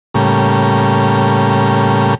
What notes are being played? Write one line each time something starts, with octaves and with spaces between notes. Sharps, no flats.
A2 C#3 G3 A#3